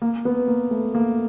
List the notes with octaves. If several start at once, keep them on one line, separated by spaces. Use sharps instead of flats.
A#3
B3
A#3
A3
A#3